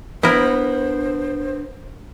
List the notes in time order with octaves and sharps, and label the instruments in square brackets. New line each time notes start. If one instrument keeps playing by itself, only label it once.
[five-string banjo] B3 [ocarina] D4 [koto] E4 A#4 [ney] C5